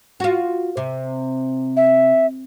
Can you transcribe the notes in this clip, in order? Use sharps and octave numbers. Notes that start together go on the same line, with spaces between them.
F4 F#4
C3
E5